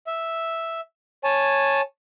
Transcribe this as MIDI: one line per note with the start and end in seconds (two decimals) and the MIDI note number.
0.07 0.80 76
1.24 1.81 73
1.24 1.81 80
1.24 1.81 81